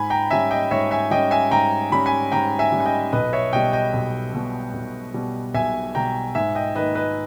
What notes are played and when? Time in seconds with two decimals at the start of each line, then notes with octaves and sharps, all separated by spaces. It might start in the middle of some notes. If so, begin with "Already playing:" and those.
Already playing: G#2 G#5 B5
0.10 G5 A#5
0.31 G3 C#4 E5 G#5
0.51 D#5 G5
0.71 G#2 C#5 E5
0.91 E5 G#5
1.11 G3 C#4 D#5 G5
1.31 E5 G#5
1.51 G#2 G5 A#5
1.92 G3 C#4 B5
2.06 G#5 B5
2.32 G#2 G5 A#5
2.59 E5 G#5
2.72 G3 C#4
2.80 G#5
2.85 D#5 G5
3.12 B1 B4 D#5
3.33 C#5 E5
3.53 B2 G3 D#5 G5
3.73 D#5 G5
3.94 B1
4.34 B2 G3
4.74 B1
5.14 B2 G3
5.54 B1 E5 G#5
5.95 B2 G3 G5 A#5
6.35 G#2 E5 G#5
6.55 D#5 G5
6.75 D#3 A#3 D#4 B4 D#5
6.95 B4 D#5